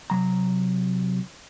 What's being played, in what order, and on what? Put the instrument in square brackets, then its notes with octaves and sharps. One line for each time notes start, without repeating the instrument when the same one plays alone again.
[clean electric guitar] C3 F#3 A#5